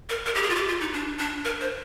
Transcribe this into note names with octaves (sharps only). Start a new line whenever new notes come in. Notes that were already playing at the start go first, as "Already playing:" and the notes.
A#4
A#4
G4
G#4
F4
G4
F4
D#4
D4
D4
A#4
C5